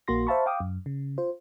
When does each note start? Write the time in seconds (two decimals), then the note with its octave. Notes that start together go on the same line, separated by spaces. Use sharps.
0.08 A#1 A#3 F#4 C6 A#6
0.27 C5 E5 F5 A5 B5 C#6
0.46 F5 G5 D6 D#6
0.60 F#2
0.86 C#3
1.18 F4 C5